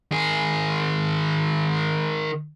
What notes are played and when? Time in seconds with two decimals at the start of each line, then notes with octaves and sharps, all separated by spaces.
0.11 D#3 G#4